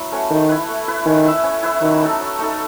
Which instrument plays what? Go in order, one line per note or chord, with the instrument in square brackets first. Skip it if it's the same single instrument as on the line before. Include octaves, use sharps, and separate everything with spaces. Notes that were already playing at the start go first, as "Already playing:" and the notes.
Already playing: [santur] F#3 B3 E4
A3 C#4 F#4
[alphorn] D#3 [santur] A3
[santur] E4 B4
A3
E4 B4
[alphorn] D#3 [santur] C#4
[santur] E4 B4 E5
C#4
E4 B4 E5
[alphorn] D#3 [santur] F#3
[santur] A3 D#4 A4
F#3
A3 D#4 A4